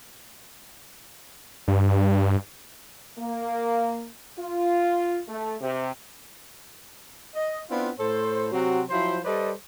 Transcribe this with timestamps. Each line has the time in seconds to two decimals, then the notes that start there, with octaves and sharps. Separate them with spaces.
1.68 G2
3.19 A#3
4.39 F4
5.28 A3
5.61 C3
7.34 D#5
7.70 B3 C4 D4 E4 F4
7.99 A2 A4 C5
8.53 C3 F#3 C4 F#4
8.90 F3 F#3 E4 F4 C5
9.25 G3 A4 B4 C5 D5 D#5